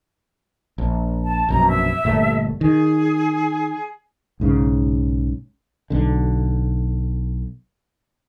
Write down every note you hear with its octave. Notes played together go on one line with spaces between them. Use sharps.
A#1
A5
A#1 F#2 B2 A#5
E5
G1 A#2 A3
D#3 G#4
B1 G#2 C#3
B1 D3